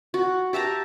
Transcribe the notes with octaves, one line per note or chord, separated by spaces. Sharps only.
F#4
G4 E5 A5 A#5